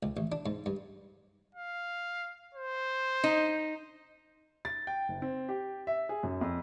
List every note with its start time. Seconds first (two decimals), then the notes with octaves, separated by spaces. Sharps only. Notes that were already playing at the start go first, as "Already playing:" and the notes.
0.03 C#2
0.17 A1
0.32 D4
0.46 G#2
0.66 G2
1.55 F5
2.55 C5
3.24 D#4
4.65 A6
4.87 G5
5.09 F#1
5.22 C4
5.49 G4
5.87 E5
6.09 G#4
6.23 F#2
6.41 F2